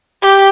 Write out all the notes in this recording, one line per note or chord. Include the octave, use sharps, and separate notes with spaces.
G4